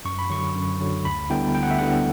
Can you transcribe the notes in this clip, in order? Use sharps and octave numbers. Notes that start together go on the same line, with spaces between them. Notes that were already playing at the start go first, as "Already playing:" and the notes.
F#2 C#6
B5
D3 F#3 C#6
F#2
D3 F#3
D2 B5
D3 G3 B3 E4 G5
D2 G5
F#5
E5
D3 G3 B3 E4 F#5